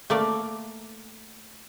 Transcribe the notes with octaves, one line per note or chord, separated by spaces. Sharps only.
A3 A#3 D5